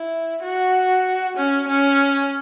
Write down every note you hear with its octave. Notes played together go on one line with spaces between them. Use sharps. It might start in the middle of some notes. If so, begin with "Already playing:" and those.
Already playing: E4
F#4
C#4
C#4